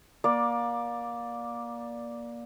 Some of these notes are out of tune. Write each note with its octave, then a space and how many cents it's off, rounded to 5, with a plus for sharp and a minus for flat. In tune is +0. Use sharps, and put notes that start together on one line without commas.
A#3 +25 D5 +0